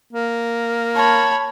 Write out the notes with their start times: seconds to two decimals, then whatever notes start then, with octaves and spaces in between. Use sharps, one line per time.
0.13 A#3
0.96 C#5 A5 B5